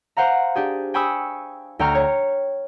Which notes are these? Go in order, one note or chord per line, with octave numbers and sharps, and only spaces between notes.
C5 F5 F#5 A#5
D4 G4 G#4
G5 G#5 B5 C#6 D#6 E6
D2 G5 A#5 C#6 F6
C#5